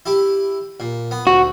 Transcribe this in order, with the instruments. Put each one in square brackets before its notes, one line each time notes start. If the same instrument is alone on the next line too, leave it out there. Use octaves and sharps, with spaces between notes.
[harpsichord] E4 G4
A#2
B3
[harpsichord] D2 [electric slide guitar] F#4